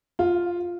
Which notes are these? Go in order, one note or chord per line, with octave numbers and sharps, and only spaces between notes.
F4